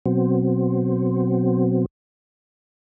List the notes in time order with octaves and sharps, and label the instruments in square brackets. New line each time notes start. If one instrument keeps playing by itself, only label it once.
[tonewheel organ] B2 F#3 C4